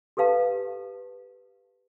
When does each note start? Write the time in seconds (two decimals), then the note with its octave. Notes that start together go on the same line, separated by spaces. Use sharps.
0.17 G4 A4 B4 F5 A5